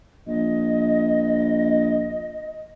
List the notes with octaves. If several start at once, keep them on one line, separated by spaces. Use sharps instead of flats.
A#1 D#5